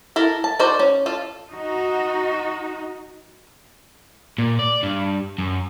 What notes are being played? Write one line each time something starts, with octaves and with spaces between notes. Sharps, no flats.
E4 A4 A#4
A5
D#4 F#4 A4 C5 D5
C#4
F4 A4
D#4 F#4
A#2
D5
G2
F#2